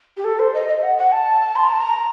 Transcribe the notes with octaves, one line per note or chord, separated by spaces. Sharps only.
G4
A4
C5
D#5
D#5
F#5
F#5
A5
C6
A#5
A5
A#5